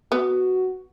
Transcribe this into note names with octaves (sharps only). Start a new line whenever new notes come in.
B3 F#4